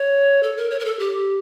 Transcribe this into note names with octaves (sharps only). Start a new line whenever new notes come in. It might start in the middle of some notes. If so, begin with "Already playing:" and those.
Already playing: C#5
A4
A#4
C#5
A#4
A4
G4